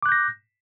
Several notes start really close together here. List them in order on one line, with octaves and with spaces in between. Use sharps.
D6 F#6 G6 A#6